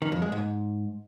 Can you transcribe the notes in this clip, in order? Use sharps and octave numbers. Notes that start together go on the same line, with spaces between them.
D#3
F2
G#3
G#2